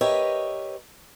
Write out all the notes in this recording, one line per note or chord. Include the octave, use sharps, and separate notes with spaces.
G4 A#4 B4 C#5 D#5 E5